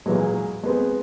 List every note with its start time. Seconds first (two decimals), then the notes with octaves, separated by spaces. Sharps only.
0.06 A#2 E3 F#3 G#3
0.63 G#3 B3 C4